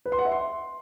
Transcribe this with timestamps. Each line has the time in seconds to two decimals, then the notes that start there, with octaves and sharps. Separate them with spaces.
0.06 B4
0.12 C6
0.19 F#5
0.25 E5
0.32 C6